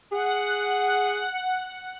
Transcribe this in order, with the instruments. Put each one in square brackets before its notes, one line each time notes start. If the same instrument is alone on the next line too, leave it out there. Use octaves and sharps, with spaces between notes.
[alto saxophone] G#4 [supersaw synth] F#5